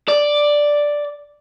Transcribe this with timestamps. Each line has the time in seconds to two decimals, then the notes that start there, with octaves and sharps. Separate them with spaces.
0.09 D5